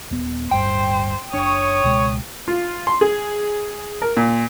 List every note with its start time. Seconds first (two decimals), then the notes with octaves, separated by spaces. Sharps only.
0.11 D#1 B3
0.51 D1 G1 G2 C5 G5
1.34 F#1 D4 C#5 D#6
1.84 C#2 B2 G#3
2.48 F4
2.87 C6
3.01 G#4
4.02 A#4
4.17 A#2